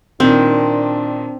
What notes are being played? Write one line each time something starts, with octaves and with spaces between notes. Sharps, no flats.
A#2 D#3 C4 D4